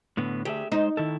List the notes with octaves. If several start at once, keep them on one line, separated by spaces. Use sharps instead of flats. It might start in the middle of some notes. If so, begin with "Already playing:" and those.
A2 D3 B3
D2 G4 G#4 E5
G#3 D#4 C5
D#3 E4 A4